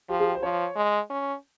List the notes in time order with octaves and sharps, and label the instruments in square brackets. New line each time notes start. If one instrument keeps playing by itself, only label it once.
[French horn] F3 [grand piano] G4
[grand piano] G#4
G4
C5
[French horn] F3 [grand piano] C#5
[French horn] G#3
C#4